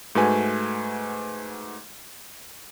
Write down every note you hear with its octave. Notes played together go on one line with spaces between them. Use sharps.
G#2 A3 F#4 B4 G#5